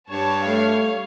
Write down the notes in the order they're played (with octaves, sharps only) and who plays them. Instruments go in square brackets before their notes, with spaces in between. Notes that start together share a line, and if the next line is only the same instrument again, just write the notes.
[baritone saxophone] G2 [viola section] G3 C#5 [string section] A5
[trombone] A3 [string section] F5